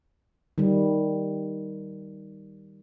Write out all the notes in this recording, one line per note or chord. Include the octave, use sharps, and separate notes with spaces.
D#3 G3